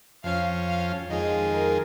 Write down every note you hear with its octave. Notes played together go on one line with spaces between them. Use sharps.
F2 F3 C#4 F5
F5
F2 D#3 G#3 F4 G#4 D#5
A#4